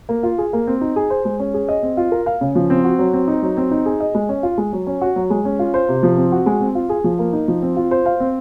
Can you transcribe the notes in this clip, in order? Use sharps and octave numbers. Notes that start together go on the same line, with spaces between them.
A#3
F4
G#4
A#3
C4
D#4
G#4
C5
G#3
C#4
G#4
D#5
C4
F4
A#4
F5
C#3
F3
C4
F#4
F#3
C4
D#4
F#3
C4
D#4
G#4
D#5
G#3
C#4
F4
G#3
F#3
C#4
F#4
F#3
G#3
C#4
F4
C5
C3
F3
C4
F#4
G#3
C4
F4
G#4
F3
A#3
D#4
F3
C4
F4
C5
F5
C4